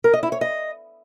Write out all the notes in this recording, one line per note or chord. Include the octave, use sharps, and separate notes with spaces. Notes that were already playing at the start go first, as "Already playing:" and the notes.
A#4
D#5
E4
C#5
D#5